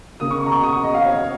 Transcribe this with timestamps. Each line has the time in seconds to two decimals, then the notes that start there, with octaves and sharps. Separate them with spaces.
0.20 C#3 A#3 D#6
0.31 C#6
0.41 C#6
0.47 A#5
0.52 C#6
0.63 D#6
0.73 C#6
0.84 D#5
0.94 F5
1.05 C#5